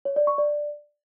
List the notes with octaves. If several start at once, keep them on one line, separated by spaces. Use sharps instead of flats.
C#5
D5
C#6
D5